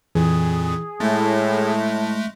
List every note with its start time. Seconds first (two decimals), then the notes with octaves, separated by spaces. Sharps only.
0.15 F2 A#2 E3 G#4
1.00 A2 G#3 A3 A5